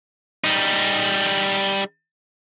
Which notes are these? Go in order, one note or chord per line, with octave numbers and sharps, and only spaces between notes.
G3 D#4